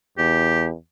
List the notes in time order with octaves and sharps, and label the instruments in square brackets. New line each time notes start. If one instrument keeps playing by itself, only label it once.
[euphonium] E2 [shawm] G4